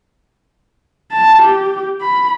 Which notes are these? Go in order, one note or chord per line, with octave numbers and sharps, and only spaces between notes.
A5
G4
B5